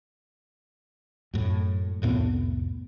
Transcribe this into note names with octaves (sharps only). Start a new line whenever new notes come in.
F#2 A2
C2 F2 A2 B3